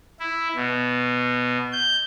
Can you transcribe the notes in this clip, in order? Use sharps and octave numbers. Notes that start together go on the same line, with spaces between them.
E4
B2
G6